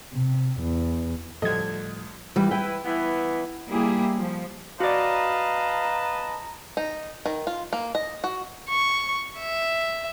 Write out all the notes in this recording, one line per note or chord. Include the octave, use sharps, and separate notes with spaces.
C3
E2
D2 A2 F3 G3 A4 D#5 G#6
E3 G3
E4 B4 G5
E3 B3 E4
G3 A#3 E4 G4 G#4
F3
F#4 B4 D5 D#5 F5 A5 A#5
D#4
D#3
F4
A#3
D#5
F#4
C#6
E5